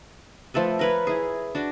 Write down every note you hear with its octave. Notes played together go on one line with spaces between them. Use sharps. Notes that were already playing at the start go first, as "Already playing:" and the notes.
F3 A3 A4 B4
A#4 B4 C#5
E4 G#4
D4 F#4